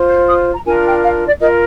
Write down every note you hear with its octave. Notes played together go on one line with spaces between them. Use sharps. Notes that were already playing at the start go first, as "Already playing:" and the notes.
Already playing: F4 C5
G6
D#6
A#5
D4 F4 A#4 G#5
G5
F5
D5
F4 A#4 D#5